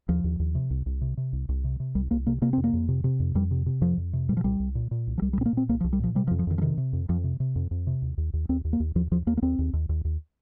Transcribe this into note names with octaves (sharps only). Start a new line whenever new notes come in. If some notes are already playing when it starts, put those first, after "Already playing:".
D#2 F3
D#2
D#2
C3
C2
C2
C3
C3
C2
C2
C3
C3
C2 G3
C2 A#3
C3 A#3
C3 A#3
F2 C4
A#3
F2
C3
C3
F2
F2 G3
C3
C3
F2 F3
F2
C3
A#2 G3
F3
C2 G3
C2
A#2
A#2
C2
F3
C2 G3
G3
A#2 C4
A#3
A#2 C4
C2 A#3
F3
C2
G3
A#2 F3
C3 G3
F3
F2
F3
F2 D#3
F3
C3 D#3
C3
F2
F2 F3
C3
C3
F2
F2
C3
D#2
D#2
D#2
D#2 C4
D#2
A#3
D#2
D#2 F3
D#2 F3
D#2 A#3
A#3
D#2 C4
D#2
D#2
D#2
D#2